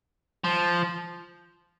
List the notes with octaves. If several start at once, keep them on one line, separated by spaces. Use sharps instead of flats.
F3